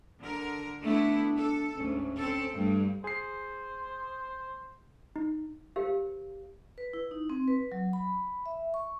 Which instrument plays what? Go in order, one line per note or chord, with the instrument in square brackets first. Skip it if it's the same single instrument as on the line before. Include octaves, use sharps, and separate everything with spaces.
[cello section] D3 A#4
[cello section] A3 B3 E4 [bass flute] D4
[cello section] A4
[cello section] D2 G#2 [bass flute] C#4
[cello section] C4 A4
[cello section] G2 G3 [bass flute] A3
[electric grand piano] G#4 C7 [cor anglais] C5
[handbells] D#4
[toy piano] G4 A#4 C5 F5
[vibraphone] B4
E4
D#4
C4
B4
F#3
B5
E5
C#6